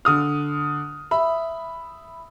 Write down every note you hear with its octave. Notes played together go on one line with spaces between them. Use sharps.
D3 D#6 F6
E5 B5